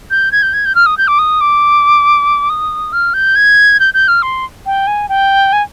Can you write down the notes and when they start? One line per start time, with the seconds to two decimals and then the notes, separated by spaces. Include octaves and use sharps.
0.11 G6
0.32 G#6
0.42 G6
0.53 G#6
0.65 G6
0.75 F6
0.86 D#6
0.98 G6
1.08 D6
1.19 D#6
1.41 D6
2.50 D#6
2.93 F6
3.14 G6
3.36 G#6
3.80 G6
3.94 G6
4.08 F6
4.22 C6
4.66 G5
4.87 G#5
5.09 G5
5.53 G#5